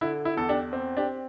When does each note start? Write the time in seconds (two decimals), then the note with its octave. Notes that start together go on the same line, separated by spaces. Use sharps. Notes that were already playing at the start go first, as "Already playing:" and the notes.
0.01 D3 E4
0.25 E4
0.37 E2 A4
0.49 D4 G4
0.73 C4
0.97 D4 G4